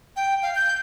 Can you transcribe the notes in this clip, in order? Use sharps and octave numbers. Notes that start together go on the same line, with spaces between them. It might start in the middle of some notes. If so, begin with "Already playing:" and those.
G5
F5
G6